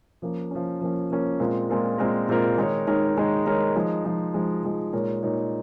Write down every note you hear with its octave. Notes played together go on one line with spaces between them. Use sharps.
F3 A#3 C#4
F3 A#3 C#4
F3 A#3 C#4
F3 A#3 C#4
A#2 G#3 C4 F4 A#4
A#2 G#3 C4 F4 A#4
A#2 G#3 C4 F4 A#4
A#2 G#3 C4 F4 A#4
D#3 G#3 D#4 A#4 C#5
D#3 G#3 D#4 A#4 C#5
D#3 G#3 D#4 A#4 C#5
D#3 G#3 D#4 A#4 C#5
F3 G#3 D#4
F3 G#3 D#4
F3 G#3 D#4
F3 G#3 D#4
A#2 G#3 D#4 A#4 C#5
A#2 G#3 D#4 A#4 C#5